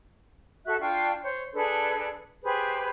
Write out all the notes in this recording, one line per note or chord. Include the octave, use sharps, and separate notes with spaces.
F#4 A4 E5 F#6
D4 F4 G5 C#6
C5 C#5
D4 G#4 A4 B4
G4 G#4 B4 C5